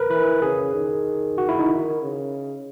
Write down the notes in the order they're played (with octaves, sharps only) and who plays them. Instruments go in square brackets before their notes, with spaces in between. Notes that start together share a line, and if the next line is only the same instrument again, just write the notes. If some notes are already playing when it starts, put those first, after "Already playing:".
Already playing: [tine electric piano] A#4 B4
[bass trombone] E3 [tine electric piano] B4
[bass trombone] C#3 [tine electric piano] G#4
[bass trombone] D#3
[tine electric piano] F#4
E4
D#4
[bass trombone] D#3
C#3